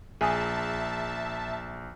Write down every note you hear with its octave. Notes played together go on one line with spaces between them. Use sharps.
A#1 G#4 E5 A5